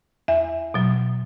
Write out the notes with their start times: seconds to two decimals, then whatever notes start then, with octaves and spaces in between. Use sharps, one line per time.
0.28 E2 E5
0.74 B2 F#3